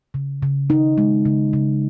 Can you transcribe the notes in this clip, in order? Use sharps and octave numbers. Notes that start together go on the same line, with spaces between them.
C#3
C#3
D#4
G#3
C#3
C#3